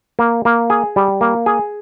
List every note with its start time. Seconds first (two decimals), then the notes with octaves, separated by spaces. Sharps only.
0.19 A#3
0.45 A#3
0.70 G#4
0.96 G3
1.21 A#3
1.46 G#4